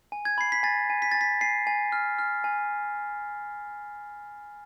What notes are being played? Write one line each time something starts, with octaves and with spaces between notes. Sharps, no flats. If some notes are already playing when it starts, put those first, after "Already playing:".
G#5
G#6
B5 C7
B6
G#5 A6
G#5
B6
G#5 A6
B6
G#5 C7
G#5
F6
F6
G#5